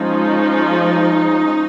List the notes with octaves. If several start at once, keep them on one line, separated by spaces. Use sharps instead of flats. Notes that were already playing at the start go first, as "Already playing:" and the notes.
Already playing: F3 G#3 C#4 D#4